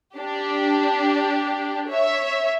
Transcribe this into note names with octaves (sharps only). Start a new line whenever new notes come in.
D4 G4
C#5 E5